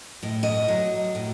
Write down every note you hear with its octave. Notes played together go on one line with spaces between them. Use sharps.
A2 D#5
D#5
F#3
A2